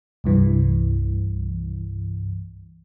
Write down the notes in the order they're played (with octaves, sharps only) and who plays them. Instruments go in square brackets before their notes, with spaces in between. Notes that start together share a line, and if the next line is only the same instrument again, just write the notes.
[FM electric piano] C2 G2 E3